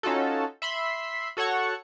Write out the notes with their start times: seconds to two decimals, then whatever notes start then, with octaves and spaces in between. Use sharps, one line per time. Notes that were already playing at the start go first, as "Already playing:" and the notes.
0.03 C#4 D#4 F4 F#4 A4
0.62 E5 B5 C6
1.37 F#4 A4 C#5 F#5 C#6